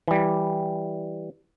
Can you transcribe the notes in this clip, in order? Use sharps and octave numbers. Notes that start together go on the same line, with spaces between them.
E3 G3